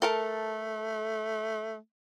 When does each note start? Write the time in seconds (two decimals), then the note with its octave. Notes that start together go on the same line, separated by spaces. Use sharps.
0.02 A3 A4 A#4 A5